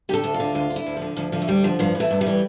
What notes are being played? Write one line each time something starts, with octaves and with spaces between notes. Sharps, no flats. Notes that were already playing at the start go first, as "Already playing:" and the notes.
D3 G4 A4
D2
F4
D3
D2 F4
D3
E4
D2
F3
D3
D2 F3
D3 F3
A3
D2 G3
D3 F3
G2 F3
E3
A3
G2
G3
E3